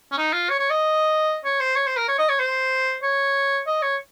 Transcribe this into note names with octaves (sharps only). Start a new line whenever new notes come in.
C#4
D#4
F4
C#5
C#5
D#5
C#5
C5
C#5
C5
A#4
C#5
D#5
C#5
C5
C#5
D#5
C#5